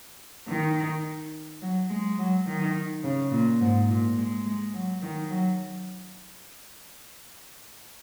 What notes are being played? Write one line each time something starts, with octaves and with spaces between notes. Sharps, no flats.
D#3
F#3
G#3
F#3
D#3
C#3
A#2
G#2
A#2
G#3
G#3
F#3
D#3
F#3